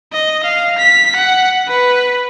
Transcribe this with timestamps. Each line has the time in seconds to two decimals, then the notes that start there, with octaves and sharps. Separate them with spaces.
0.13 D#5
0.44 F5
0.78 B6
1.16 F#5
1.68 B4